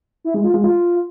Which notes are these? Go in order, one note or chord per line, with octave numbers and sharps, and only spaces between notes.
E4
G#3
F4
G#3
F4